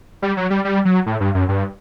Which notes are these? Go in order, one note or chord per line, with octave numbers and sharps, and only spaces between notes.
G3
F#3
G3
G3
F#3
A2
G2
F#2
G2